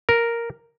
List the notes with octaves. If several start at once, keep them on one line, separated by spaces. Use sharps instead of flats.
A#4